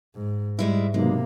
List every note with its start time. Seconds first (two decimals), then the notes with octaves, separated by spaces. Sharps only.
0.16 G#2
0.59 G#2 G3 G#3 E4
0.94 B1 C3 G#3 A#3